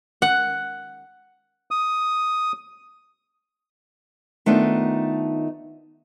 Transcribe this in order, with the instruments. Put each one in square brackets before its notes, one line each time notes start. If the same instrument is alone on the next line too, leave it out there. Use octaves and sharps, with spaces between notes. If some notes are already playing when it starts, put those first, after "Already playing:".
[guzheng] F#5
[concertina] D#6
[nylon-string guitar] D#3 A3 B3 D4 D#4 F4